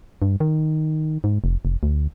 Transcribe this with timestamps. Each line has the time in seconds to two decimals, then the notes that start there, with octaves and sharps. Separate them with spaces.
0.22 G2
0.40 D#3
1.24 G#2
1.44 F1
1.65 F1
1.83 D2